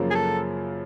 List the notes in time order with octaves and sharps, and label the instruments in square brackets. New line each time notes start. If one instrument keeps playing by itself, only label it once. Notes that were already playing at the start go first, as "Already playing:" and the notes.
Already playing: [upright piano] F#2 C#3 F3 A#3
[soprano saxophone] G#4
A4